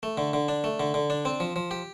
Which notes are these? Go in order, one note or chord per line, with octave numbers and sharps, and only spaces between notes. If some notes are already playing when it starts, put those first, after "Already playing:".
A3
D3
D3
D4
A3
D3
D3
D4
C4
F3
F3
G4